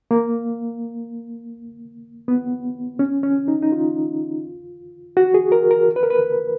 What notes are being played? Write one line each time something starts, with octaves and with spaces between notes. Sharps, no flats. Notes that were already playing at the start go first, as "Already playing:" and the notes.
A#3
B3
C#4
C#4
D#4
D#4
F4
F#4
G#4
A#4
A#4
B4
A#4
B4